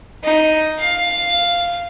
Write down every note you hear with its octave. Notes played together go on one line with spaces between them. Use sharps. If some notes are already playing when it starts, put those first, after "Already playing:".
D#4
F5